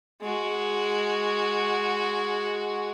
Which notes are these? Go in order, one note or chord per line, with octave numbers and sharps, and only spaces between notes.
G#3 F#4